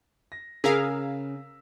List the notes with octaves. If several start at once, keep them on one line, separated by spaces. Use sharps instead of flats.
A#6
C#3 G#4 A#4 F5 E6 B6